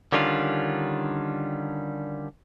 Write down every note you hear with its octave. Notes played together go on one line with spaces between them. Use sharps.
D3 D#3 G3 C#4 D4 F4